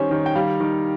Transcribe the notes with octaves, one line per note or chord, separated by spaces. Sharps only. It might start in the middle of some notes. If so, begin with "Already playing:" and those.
Already playing: D#3 G3 C#4 C5 C#5
D#3
G5
G3 F5
D#3